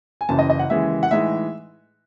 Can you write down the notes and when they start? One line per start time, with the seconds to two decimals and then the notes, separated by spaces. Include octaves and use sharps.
0.21 G#5
0.29 F#1 F#2 C#3 E3 A5
0.39 D#5
0.50 D#5
0.59 F#5
0.70 D#2 C#3 E3 G#3 E5
1.03 F#5
1.11 A2 E3 G#3 D#4 E5